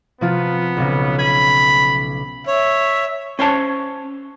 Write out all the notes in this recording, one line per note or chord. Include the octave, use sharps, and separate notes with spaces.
C3 F3 B3 F4
B1 C#3
B5 G#6 D#7
C#5 E5
C#4 C5 C#5 A5